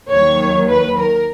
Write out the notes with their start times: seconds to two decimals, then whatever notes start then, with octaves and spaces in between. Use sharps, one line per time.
0.10 D#2 D#3 F#3 C#5
0.68 B4
0.98 A#4